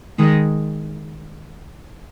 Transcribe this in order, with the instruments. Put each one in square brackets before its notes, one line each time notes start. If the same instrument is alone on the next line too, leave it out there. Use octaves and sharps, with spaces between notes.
[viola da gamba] D#3 G#3